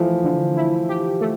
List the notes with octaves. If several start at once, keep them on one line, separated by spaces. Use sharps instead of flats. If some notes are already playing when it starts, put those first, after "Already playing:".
Already playing: E3 F3 A3
D3
E4
G4
A3